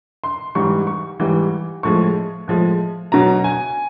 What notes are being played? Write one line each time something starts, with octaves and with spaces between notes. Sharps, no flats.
C6
G#2 E3 G3 C#6
C#6
G#2 E3 G3
A2 F3 G#3 C#6
A2 F3 G#3
B2 F#3 A#5
G#5